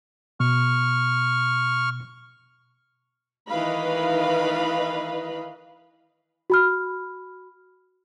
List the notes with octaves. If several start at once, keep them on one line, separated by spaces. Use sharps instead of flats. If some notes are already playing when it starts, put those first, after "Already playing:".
B2 C#6 F6
D#3 E3 B4 D#5 F5 B5
F#4 B5 F6